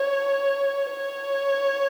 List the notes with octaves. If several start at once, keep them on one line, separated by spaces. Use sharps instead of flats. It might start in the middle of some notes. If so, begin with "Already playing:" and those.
Already playing: C#5
C#5